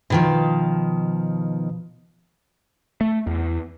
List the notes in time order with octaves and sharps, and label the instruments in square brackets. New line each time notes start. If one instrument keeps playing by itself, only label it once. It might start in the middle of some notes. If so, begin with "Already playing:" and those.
[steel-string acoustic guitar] B2 D#3 F3
[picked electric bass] A3
E2